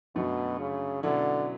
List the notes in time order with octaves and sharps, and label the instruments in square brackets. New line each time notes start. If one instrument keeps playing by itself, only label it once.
[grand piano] F#2 D3 F#3 A3 [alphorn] B2
[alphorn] C#3
[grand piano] B2 F#3 C#4 E4 [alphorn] D3